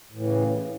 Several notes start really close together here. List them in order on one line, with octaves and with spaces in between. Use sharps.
A2 E3 C#3